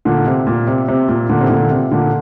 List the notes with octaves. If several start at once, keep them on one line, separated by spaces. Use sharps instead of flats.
A#2 D3
C3
A#2
C3
C3
A#2
A#2 D3
C3
A#2 D3
C3
A#2 D3